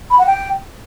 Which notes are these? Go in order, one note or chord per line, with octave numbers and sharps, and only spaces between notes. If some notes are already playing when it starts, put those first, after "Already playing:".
B5
F#5
G5